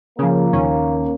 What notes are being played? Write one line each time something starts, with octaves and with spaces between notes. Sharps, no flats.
C#3 F3 A#3
D#2 C#4